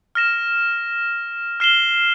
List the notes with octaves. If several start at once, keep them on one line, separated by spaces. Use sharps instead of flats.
F6 A#6 E7
F6 C7 E7 G7